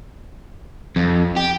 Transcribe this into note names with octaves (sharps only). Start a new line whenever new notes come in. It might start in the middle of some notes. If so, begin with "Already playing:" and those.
F2
G4